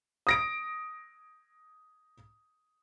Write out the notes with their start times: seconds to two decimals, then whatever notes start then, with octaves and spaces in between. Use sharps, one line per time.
0.27 D#6 A#6 D7